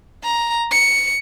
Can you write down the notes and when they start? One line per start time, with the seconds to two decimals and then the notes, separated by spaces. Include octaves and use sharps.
0.24 A#5
0.72 C#7